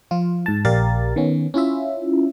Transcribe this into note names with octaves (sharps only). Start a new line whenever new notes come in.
F3 F4
G#2 A5
A#1 G4 A#4 D5 F5 A6
D#3 B3 C#4
C#4 E4 F4 E5